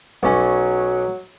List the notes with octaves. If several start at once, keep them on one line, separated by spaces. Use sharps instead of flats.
B1 F#3 C#4